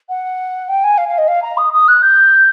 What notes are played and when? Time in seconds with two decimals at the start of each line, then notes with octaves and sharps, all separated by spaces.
0.09 F#5
0.68 G5
0.83 G#5
0.98 F5
1.08 F5
1.18 D#5
1.28 F5
1.42 A#5
1.57 D#6
1.73 D#6
1.88 F#6
2.02 G6